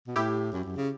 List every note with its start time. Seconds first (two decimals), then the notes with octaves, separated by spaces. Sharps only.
0.07 B2
0.16 A2 E4 G4
0.52 F#2
0.64 F#2
0.77 C#3